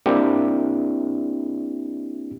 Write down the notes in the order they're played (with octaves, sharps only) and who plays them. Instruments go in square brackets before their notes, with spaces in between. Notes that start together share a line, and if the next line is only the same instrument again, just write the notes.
[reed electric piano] A#3 C4 D4 E4 G4